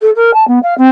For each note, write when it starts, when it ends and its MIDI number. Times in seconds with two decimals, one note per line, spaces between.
0.01 0.10 69
0.16 0.33 70
0.33 0.46 81
0.47 0.59 59
0.63 0.76 77
0.77 0.90 60